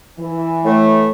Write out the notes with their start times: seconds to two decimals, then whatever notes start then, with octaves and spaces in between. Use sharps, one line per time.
0.19 E3
0.65 A2 A3